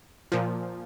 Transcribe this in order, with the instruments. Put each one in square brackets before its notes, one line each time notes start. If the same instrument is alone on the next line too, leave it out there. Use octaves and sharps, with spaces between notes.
[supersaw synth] A#2 F3